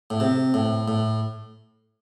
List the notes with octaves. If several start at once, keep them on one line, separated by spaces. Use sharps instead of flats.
A2
C3
A2
A2